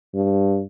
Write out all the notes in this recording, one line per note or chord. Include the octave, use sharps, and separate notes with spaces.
G2